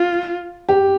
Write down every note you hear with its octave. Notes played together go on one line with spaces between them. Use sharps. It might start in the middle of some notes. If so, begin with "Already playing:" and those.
Already playing: F4
G4